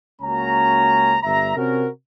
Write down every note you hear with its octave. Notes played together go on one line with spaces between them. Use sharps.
C#2 A#3 C#4 F#4 A#5
G1 G2 E5 A#5
C3 C4 C#4 F#4 A#4